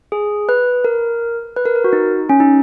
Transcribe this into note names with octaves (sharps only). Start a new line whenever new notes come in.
G#4
B4
A#4
B4
A#4
A#4
F#4
D#4
C#4
D#4